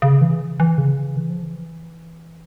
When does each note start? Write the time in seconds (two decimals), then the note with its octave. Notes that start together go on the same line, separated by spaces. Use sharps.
0.02 C#3
0.21 E3
0.60 E3
0.78 C#3
1.17 E3
1.29 F3
1.42 E3